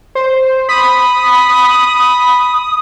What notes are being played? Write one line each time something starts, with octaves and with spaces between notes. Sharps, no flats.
C5
B5 D#6